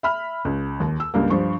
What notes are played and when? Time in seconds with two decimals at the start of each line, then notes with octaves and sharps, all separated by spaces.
0.03 E5 B5 F6
0.45 C#2
0.80 D#2
1.00 E6
1.14 C#2 G2 A#3
1.30 G2 F3 C5 C#6